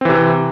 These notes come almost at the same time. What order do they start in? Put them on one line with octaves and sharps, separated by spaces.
C4 E3 C3